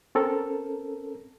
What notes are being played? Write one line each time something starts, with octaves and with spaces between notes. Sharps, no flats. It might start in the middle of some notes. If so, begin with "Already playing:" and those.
C4 C#4 A4 A#4